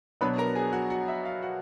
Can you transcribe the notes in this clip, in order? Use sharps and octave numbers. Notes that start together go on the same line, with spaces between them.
B2 F#3 B3 D4 B4 B5
A#4 A#5
G#4 G#5
F#4 F#5
F#4 F#5
E5
F5
F#4 F#5